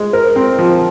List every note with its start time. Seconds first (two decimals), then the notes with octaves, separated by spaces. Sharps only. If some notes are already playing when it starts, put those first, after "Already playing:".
Already playing: G#3
0.13 A#4
0.36 C4
0.59 F3